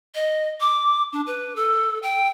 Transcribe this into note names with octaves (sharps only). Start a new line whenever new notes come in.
D#5
D6
D4
B4
A4
G5